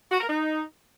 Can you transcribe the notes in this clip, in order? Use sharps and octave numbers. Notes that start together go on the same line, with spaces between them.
F#4
A#4
D#4